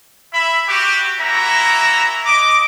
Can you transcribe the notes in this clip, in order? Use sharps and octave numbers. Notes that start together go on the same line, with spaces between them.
E4 E5 B5
F#4 G4
A#3 C#4 E4 F#4 E5 A#5
D#5 D6